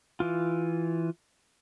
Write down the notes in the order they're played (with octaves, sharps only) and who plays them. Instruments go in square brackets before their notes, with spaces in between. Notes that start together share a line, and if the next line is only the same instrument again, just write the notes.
[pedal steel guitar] E3 F4